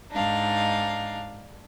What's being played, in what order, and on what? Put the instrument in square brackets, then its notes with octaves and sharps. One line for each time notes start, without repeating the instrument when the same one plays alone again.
[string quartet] G#2 D#4 [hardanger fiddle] D4 F5